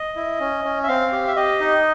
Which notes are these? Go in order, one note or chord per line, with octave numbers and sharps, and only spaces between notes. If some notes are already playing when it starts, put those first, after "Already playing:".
Already playing: D#5
E4
C#4
C#4
E5
C4 F5
G4
E5
G4 D#5
D#4